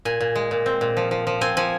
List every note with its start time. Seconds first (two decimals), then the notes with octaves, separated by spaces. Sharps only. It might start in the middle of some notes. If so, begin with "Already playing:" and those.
0.05 A#2 G#5
0.20 A#2
0.35 G#3
0.51 A#2
0.66 C4
0.81 A#2
0.97 F3
1.11 F3
1.27 F3
1.41 C4 G#5
1.57 F3 G#5